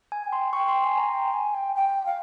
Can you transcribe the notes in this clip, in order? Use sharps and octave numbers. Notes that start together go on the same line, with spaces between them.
G#5
G#5
G5
C6
G5 C#6
C6
G#5 C6
A#5
G5
G#5
G5
G5
F5